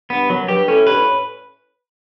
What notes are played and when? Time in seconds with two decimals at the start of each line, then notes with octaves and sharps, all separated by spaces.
0.10 G2 B3
0.29 F#2 F#3
0.48 G2 G4
0.67 A2 C#4
0.87 G2 B4
0.97 A2